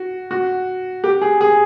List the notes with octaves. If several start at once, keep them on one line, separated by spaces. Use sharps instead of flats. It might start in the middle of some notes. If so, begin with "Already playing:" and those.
Already playing: F#4
F#4
G4
G#4
G#4